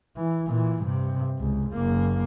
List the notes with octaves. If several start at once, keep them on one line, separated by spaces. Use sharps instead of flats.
E3
A#2 E3
G2 C3
C#2
F#1 A#3